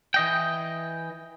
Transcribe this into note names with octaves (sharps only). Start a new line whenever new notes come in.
E3 D#5 G5